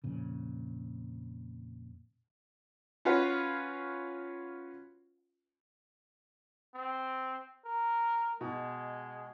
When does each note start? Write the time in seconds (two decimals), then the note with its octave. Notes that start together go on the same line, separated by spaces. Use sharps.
0.04 F2 A#2 C#3
3.05 C#4 F4 F#4 B4 F5
6.75 C4
7.65 A#4
8.41 B2 G#3